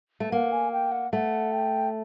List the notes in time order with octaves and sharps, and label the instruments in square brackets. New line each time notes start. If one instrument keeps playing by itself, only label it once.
[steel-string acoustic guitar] A3
[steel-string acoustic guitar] A#3 [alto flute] F#5
[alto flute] G#5
G5
F#5
[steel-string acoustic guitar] A3 [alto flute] F#5
[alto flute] G5